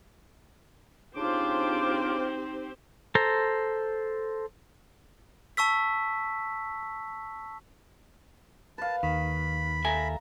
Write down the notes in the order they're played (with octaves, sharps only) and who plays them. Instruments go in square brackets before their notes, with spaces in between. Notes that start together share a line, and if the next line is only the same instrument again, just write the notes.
[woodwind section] C#3 D4 D6 [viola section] C4 G4 C5 [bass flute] D#4 [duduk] F4
[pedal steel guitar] A4 C5 A#5
[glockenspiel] A5 C#6 E6 B6
[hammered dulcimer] B4 F5 [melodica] A5
[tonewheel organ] D#2 [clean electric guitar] D#3 [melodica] B5
[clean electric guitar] A4 E5 G#5 [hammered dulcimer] A#5